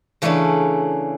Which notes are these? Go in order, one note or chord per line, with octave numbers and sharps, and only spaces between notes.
C#3 E3 A3 C#4 D4 E4